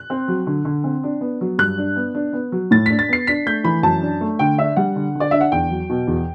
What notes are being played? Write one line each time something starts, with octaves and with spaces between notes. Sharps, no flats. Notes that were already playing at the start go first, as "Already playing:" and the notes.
Already playing: F#6
C4
F#3
D3
D3
C4
D4
B3
F#3
G2 F#6
D4
B3
D4
B3
F#3
A2 A6
D4 B6
A6
B3 C7
D4 B6
A3 G6
E3 B5
F#2 A5
D4
A3
D3 G5
D4 E5
G3 F#5
D3
D3
D5
D4 E5
F#5
E2 G5
F#3
B2
E2